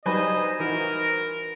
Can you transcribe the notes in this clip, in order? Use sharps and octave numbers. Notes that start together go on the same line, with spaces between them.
F#3 G3 D#4 B4 C5 D#5 G#5
E3 D#4 F#4 A#4